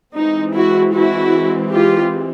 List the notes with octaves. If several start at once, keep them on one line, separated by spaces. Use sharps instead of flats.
E3 G#3 C4 D#4
E4 F#4
E4 F#4
F4 G4